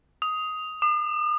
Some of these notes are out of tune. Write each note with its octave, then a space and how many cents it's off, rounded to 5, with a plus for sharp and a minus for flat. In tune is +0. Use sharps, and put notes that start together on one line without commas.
D#6 +10
D#6 -45